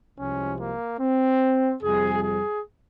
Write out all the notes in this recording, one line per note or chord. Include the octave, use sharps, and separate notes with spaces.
C2 C3 F3 G#3 C#4
A#3
C4
F2 C3 G3 G#4
G#4